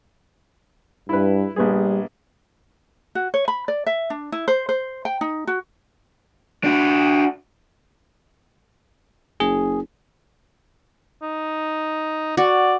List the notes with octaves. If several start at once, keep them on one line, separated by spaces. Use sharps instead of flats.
G2 E4 B4
A#1 G3 B3 G#4
F#4
C#5
B5
D5
E5
D4
E4
C5
C5
G5
D#4
F#4
D4 F#4
F#1 G#4
D#4
F#4 D5